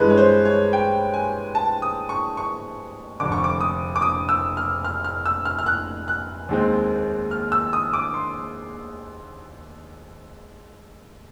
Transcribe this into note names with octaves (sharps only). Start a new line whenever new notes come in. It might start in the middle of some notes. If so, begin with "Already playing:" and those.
Already playing: G2 E3 G#3 B4
C#5
C5
C#5
G5
G#5
A5
D#6
C#6
C#6
F1 F2 D3 D6
C#6
D6
D#6
D6
D#6
E6
F6
F6
F6
E6
F6
F6
F#6
F#6
D#2 D#3 G#3 C4
F6
E6
D#6
D6
C6